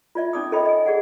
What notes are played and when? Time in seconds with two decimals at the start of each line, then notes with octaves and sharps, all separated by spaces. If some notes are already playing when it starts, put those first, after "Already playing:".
0.15 F4 D5 E5
0.33 C#4 D#4 D5 D6 D#6
0.52 A4 C#5 D#5 E5 G5 B5
0.66 D#5 G#5
0.85 G#4 D5 F#5 G#5